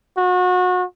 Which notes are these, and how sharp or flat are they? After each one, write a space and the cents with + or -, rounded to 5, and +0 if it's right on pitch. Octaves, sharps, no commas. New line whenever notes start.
F#4 -30